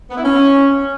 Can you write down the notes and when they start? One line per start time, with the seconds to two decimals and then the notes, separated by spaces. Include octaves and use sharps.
0.10 B3
0.17 E4
0.24 C#4